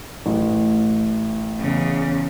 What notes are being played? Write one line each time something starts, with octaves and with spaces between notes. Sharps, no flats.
A1
E2 C#3